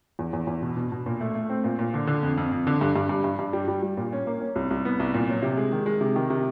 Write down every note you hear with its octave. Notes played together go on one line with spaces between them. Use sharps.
E2
E2
E2
B2
B2
B2
A#2
A3
A3
C4
A#2
A#2
D3
D3
F2
F2
F2
D3
G2
G2
G2
G2
G2
G3
G3
G3
A#2
C#4
A#3
C#4
C2
C2
B3
C2
A#2
F#3
C3
G#3
D#3
G#3
C3
D#3
C3